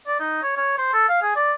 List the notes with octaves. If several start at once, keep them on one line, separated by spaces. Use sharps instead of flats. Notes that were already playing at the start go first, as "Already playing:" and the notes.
D5
D#4
C#5
C#5
C5
A4
F5
G#4
D5